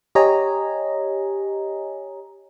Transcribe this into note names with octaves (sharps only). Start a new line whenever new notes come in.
G4 C#5 D#5 G#5 A#5